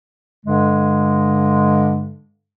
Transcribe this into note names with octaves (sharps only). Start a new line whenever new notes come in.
G2 D3 G#3